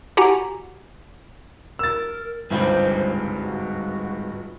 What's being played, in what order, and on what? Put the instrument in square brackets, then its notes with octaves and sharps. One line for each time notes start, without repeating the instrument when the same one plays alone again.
[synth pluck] E4 F#4 G4 F#5 G#5 A#5
[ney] A#4 [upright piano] E6 A6
[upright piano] G1 C#2 [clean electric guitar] G#2 G3 C4 [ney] C5
[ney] F#4